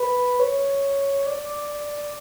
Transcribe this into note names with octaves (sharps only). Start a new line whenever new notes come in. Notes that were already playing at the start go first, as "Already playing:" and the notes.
Already playing: B4
C#5
D5